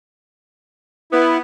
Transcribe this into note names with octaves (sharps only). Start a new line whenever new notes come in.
B3 E4